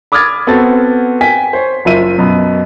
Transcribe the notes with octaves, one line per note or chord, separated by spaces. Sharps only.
B5 D6 D#6 F6 G#6 A6
B3 C4 F#4 A4 A6
G5 G#5 B6
C5 C#5
F#1 F4 E5 D#7
F#2 B2 B5